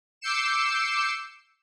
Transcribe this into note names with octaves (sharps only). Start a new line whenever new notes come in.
D6 E6 G6 C7 C#7 E7